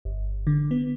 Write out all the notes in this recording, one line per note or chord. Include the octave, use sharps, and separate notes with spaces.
G1
D3
B3